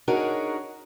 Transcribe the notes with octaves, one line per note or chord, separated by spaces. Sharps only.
D4 D#4 F#4 G#4 A#4 C#5